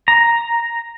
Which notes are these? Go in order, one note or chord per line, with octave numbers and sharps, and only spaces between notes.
A#5